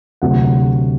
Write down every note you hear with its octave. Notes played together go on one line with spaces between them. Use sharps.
D2 C3 F#3 F#5